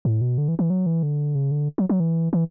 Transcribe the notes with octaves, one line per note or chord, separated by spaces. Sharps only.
A2
B2
D3
E3
E3
F#3
E3
D3
C#3
D3
F#3
F#3
E3
E3